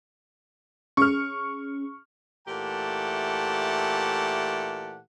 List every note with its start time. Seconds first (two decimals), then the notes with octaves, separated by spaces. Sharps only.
0.97 C#4 G#4 C#6 F6
2.47 A#2 E3 A3 G4 F#5 A5